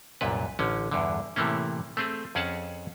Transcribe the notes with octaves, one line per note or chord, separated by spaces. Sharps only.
C2 F#2 A#2 B4
A1 D3 C#4
E2 G2 D3
A2 C3 E3 A3 A#3 C#4
A3 C4 G#4
F2 C#4 G#4 F#5 A5